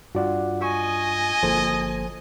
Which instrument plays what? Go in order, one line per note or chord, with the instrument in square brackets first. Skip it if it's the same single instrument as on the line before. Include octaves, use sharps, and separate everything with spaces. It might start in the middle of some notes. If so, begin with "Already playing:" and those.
[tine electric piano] G2 F4 [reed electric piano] F#4 D5 F#5
[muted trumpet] D#5 [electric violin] G#5 [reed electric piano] C#6
[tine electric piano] G1 A#3 [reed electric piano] F3 A4 C5